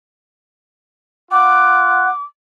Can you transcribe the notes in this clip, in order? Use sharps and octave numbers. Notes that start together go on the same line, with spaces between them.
F4 F#5 D6